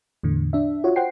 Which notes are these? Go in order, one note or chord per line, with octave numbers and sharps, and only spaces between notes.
E2 A2 D3
D4 E5
F4 F#4 C#5
C5 F#5 G5 C7